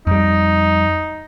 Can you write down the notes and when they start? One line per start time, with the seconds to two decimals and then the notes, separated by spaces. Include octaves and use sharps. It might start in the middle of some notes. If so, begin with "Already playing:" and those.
0.07 F2 G3 D#4